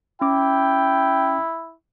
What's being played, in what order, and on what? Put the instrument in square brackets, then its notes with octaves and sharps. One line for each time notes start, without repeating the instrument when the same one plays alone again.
[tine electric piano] C#4 D6 [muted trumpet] E4 [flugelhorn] G5